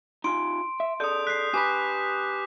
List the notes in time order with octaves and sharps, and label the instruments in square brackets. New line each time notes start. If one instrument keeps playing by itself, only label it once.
[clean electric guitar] D#4 F4 G#5 [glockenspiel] C6 D7
[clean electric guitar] E5
[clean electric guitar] G#4 A4 D5 [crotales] D#6 G6
[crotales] F#6 [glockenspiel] B6 C7
[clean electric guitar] G4 B4 B5 [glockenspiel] G#5 [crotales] D6 B6